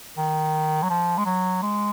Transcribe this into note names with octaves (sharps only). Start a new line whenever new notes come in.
D#3
F#3
F3
G#3
F#3
G#3